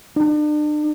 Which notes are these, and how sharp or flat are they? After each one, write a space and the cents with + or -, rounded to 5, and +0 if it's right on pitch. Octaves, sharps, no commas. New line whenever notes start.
D4 +40